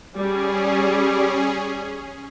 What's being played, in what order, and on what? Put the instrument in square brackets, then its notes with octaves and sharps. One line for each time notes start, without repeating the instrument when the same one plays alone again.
[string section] G3 [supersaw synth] C#4 G#4